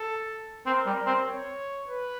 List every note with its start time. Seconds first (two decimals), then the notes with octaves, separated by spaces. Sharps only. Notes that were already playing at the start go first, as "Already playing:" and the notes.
Already playing: A4
0.66 C4 A#4
0.86 G3
1.06 C4
1.27 C#5
1.87 B4